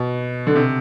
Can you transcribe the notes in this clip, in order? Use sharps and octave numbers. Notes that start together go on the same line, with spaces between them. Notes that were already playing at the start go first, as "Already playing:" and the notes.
Already playing: B2
D3
C3